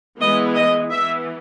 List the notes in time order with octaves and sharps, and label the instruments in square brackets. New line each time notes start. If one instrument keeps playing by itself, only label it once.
[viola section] E3 G#3 B3 D#5
D#5
E3 B3 E5